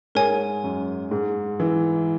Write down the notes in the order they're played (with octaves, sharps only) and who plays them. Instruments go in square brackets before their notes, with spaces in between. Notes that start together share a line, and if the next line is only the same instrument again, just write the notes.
[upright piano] G#2 [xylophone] A#4 C#5 G#5
[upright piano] F#2
G#2
E3